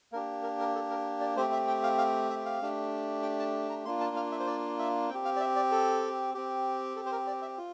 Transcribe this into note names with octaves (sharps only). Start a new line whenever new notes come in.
A#3 D4 G4 A#4
A#4
A#4
A4
A#4
D5
A3 C4 G4 C5
E5
G5
F5
F5
E5
F5
A3 D4 G4
G5
A5
A#5
A#3 D4 F4 C6
A5
F5
E5
C5
D5
E5
C4 G5
G4
F5
D5
E5
D5
A4
C4 G4
A4
C5
A#4
D5
E5
F4